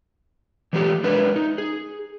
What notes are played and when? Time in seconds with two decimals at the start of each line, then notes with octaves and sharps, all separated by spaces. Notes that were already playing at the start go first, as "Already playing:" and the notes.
0.73 E3 F3 G#3 A3 G4 A4
1.04 G#3 D4 A#4 B4 E5
1.36 D#4
1.58 G#4